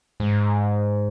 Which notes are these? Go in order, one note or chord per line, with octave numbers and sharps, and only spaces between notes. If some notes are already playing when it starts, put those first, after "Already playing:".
G#2